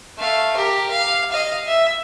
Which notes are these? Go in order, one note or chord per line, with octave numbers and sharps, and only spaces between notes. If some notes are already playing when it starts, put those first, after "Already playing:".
A3 F5
G4 A#4
F5
D#5 F5
E5